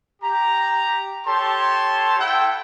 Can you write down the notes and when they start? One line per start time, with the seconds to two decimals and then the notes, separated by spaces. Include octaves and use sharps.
0.22 G4 A#5
1.27 G4 A4 C#5 A5 C6
2.19 E4 A4 F#5 G5